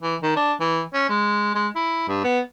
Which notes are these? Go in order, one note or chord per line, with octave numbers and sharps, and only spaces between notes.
E3
D#3
D4
E3
C#4
G#3
G#3
E4
G2
B3